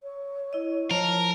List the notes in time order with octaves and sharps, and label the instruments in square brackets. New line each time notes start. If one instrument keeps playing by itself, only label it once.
[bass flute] C#5
[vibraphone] E4 D#5
[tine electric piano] F3 [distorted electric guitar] A#4 [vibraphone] A5